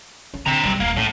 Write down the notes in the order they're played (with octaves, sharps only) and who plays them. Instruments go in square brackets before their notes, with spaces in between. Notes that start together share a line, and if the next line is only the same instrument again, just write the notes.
[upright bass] C#4
[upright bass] D3 [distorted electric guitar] C4 A#5
[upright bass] F#2 G3
[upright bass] D#1 [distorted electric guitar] A#3
[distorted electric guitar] A2 [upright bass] C#4